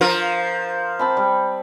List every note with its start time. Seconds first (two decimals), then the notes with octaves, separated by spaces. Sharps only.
0.01 F3 A#4
0.99 C4 A5 B5
1.17 G3